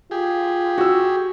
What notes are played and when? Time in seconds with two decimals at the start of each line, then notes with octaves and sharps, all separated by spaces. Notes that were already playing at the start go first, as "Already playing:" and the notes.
0.11 F4 G4 G#4
0.78 F#4 E6